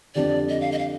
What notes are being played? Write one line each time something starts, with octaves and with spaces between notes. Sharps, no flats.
F2 D3 G3 D4 G4 D5
D#5
F5
D#5
F5